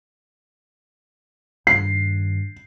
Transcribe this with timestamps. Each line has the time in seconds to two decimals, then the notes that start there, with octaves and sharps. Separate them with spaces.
1.67 G2 D#3 C7